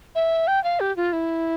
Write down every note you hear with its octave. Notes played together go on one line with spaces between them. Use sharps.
E5
G5
F5
G4
F4
E4